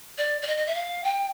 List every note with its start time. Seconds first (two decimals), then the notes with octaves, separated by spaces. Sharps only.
0.18 D5
0.42 D5
0.47 D#5
0.57 D#5
0.66 E5
0.75 F5
1.04 G5